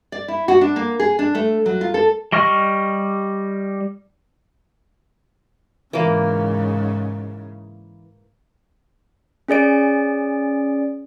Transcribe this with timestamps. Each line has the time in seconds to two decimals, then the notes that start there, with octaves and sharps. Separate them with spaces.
0.12 D5
0.28 E4
0.48 F#4
0.61 D4
0.76 A#3
1.00 G#4
1.19 D4
1.35 A3
1.66 F#3
1.81 F4
1.94 A4
2.32 G3 D#5 C#6 F6
5.93 G#2 C#3 E3 A#3
9.48 C#4 G#4 D5 D7